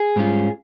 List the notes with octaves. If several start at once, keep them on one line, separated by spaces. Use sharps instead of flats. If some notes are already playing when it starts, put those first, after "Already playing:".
Already playing: G#4
G#2 G3 C#4 F4